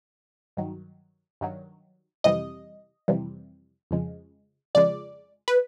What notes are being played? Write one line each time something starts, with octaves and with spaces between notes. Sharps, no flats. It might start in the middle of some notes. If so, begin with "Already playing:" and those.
G2 D#3 F#3
G2 D#3 F#3
F2 C3 E3 G3 D#5
F2 C3 E3 G3
F2 C#3 F3 G#3
F2 C#3 F3 G#3 D5
B4